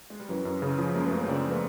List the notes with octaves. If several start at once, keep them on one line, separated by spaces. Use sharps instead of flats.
G#3
G3
F#2 E3 F#3
F#2
C#3
F3
F#2 G#3 A#3
A3 B3
F#2
A#3 C4
C#3 C4 D4
F3
A3 B3